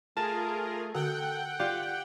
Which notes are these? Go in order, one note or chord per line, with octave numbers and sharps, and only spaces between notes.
A3 F4 G#4 A#4 A5
D3 F#4 A4 F#5 G5
F4 G4 D5